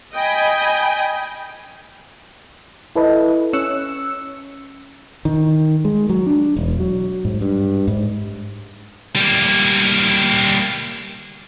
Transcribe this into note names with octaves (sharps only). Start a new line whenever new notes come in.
D#5 G5 G#5 B5
E4 A4 B4 D#5
C#4 C#5 E6 F#6 C#7
D#3
G#3
F#3
D4
E1
F#3
G#2
G2
G#2
G3 A#3